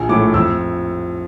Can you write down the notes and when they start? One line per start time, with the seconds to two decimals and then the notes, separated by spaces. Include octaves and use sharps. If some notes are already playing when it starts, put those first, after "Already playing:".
Already playing: A#1 G#5
0.09 A2 F3 A3 D6
0.34 F2 E6